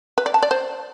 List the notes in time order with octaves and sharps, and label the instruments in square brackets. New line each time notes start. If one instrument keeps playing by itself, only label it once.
[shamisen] B4
D5
A5
D5
C5